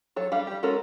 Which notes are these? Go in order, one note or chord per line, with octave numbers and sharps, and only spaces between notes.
F#3 A4 C#5
G3 D4 F5
G3 G4
G#3 C#4 F#4 A4 A#4